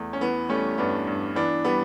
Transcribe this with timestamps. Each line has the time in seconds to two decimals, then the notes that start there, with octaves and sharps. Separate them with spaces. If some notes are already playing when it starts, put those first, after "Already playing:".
Already playing: E2 A3
0.13 C#4
0.21 E3 B3
0.49 G3 A3 C#4
0.78 G2 B3 D4
1.07 G2
1.36 E3 B3 D4
1.64 G3 B3